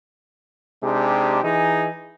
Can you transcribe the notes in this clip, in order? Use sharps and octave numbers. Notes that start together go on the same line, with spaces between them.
C3 G#3 D4 D#4 G4 G#4
E3 D#4 G#4